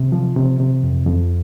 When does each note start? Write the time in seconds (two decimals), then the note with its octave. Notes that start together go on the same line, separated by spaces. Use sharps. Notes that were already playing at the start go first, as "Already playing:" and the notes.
Already playing: C3
0.12 F3
0.36 C3
0.60 C3
0.83 F2
1.06 F2